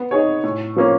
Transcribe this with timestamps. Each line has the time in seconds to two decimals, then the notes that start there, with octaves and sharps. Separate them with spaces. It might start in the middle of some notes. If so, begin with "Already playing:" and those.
Already playing: B3
0.11 D#4 G#4 C#5
0.43 A2
0.76 F3 A#3 C#4